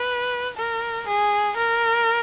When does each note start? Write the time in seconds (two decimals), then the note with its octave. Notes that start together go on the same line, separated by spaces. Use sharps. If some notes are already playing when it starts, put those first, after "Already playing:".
Already playing: B4
0.57 A#4
1.08 G#4
1.57 A#4